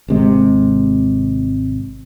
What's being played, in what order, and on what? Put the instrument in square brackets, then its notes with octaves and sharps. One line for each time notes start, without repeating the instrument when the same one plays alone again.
[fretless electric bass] G#1 C3 G#3